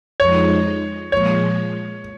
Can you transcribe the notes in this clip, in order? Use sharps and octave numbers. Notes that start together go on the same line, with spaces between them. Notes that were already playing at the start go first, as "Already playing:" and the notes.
F2 F3 G#3 D#4 C#5
A#2 F3 G#3 C#5